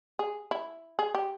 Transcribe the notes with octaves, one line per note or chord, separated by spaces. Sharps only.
G#4
E4
G#4
G4